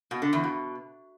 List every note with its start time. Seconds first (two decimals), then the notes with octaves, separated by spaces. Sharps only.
0.11 B2
0.22 D3
0.33 E2
0.44 B2